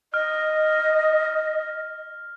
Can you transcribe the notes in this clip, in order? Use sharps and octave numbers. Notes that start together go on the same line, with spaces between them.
D#5 F6